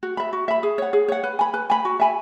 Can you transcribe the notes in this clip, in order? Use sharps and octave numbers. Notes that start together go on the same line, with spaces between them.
F#4
E5 B5
F#4
E5 B5
G#4
C#5 F#5
G#4
C#5 F#5
B4
G#5 B5
B4
G#5 B5
F#4
E5 G#5 B5